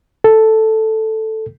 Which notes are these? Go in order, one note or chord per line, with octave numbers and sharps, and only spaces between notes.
A4